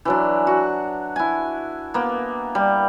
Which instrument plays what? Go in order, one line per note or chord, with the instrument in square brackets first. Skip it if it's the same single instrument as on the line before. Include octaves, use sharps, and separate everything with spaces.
[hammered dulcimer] E3 F#3 D4
F#4
E4 G#5
A#3 B3
G3